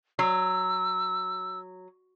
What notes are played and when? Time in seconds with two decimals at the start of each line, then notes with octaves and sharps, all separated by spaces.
0.19 F#3 E6